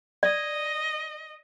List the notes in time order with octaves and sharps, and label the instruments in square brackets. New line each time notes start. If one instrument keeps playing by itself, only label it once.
[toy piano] D5 [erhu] D#5